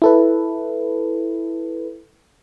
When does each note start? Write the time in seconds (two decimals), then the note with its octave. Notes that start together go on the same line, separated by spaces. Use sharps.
0.02 E4 A4 B4